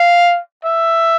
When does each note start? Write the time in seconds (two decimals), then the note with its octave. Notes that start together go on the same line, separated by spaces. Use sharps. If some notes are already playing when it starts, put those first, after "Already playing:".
Already playing: F5
0.65 E5